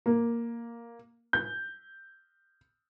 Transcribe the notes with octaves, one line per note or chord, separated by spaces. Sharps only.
A#3
G6